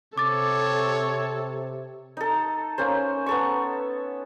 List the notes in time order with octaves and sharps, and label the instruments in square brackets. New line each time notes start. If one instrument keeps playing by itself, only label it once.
[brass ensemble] C3 [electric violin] A4 [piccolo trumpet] C#5 [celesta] D6 A6
[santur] D#4 A4
A#3 C#4 C5
B3 A4 C#6